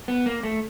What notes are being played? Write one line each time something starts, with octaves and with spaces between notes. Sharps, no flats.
B3
A#3
A3